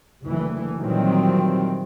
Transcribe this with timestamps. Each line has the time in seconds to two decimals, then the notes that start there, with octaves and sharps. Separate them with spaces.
0.25 F#1 D2 E3
0.78 A#2 D#3 E3 F#3 G3 C4